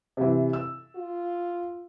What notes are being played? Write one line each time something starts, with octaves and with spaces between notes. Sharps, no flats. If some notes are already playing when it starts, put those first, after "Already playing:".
C3 E3
E6
F4